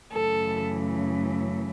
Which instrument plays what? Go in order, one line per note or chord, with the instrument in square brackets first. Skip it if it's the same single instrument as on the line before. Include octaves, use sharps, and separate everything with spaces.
[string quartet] F#2 C#3 E3 A3 A4